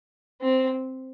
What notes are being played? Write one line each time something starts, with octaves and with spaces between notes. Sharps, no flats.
C4